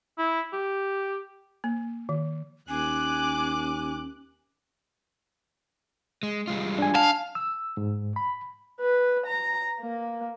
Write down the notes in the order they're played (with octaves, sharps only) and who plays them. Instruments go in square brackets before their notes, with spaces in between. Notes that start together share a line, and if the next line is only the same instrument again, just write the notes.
[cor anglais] E4
G4
[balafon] A#3
D#3
[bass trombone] D#2 [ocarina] C#4 [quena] G#5 [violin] D6 F#6
[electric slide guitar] G#3
G3 G#3 F4
[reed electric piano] D4 G#5
[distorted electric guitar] F5 [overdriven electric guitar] A5
[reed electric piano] E6
G#2
B5
[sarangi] B4
A#5
A#3